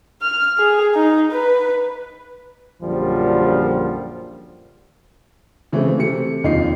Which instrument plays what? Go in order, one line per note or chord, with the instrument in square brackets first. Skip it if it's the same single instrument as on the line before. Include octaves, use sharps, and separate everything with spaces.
[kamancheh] F6
G#4
D#4
B4
[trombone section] A#1 F#2 D3 F3 G3
[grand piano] C#3 E3 G#3 A3 C4
C3 A3 C#7
F1 D#2 D#4 F4 C7